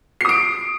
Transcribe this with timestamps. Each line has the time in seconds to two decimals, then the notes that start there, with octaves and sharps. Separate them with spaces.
0.21 C7
0.25 D#6
0.29 D7